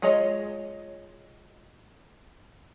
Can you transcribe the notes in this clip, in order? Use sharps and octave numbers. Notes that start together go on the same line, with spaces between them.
G#3 F4 G#4 C#5 D#5